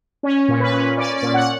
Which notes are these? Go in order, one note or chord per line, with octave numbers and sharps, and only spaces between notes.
C#4
A#2
B4
C#4
C#4 D5
D5
A#2
F#5